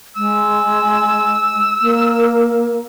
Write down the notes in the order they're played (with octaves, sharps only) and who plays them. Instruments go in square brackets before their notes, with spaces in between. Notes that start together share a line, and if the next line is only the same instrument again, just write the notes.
[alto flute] G#3 [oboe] E6
[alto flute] A#3